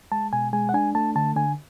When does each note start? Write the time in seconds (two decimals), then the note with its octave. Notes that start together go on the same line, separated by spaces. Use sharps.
0.12 G#3 A5
0.33 B2 G#5
0.53 G#3 G#5
0.69 F#5
0.74 D4 G#5
0.95 A3 A5
1.16 D3 A5
1.36 D3 G#5